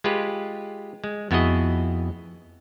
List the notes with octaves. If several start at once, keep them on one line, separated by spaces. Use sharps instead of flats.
G#3 F4 G4 B4
G#3
F2 B3 E4 F#4 G#4 D#5